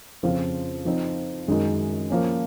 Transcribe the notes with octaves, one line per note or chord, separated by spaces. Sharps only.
F2 C#3 F3 C4 F4
F3 C4 D#4
F#2 D#3 G#3 D#4 F#4
F3 A#3 C#4